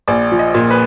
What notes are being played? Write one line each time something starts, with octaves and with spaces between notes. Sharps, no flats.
A#1 D5
F3
D#5
A#2
B4